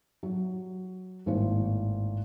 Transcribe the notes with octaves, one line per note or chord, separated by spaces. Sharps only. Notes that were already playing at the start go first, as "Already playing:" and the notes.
F#3
G#1 A2 A#3 C5